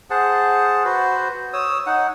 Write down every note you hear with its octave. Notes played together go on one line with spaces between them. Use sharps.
G#4 C5 F#5 A5
F#4 B4 C5
C#5 D#6 E6
D#4 F#5